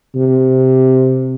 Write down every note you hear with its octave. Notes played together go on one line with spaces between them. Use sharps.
C3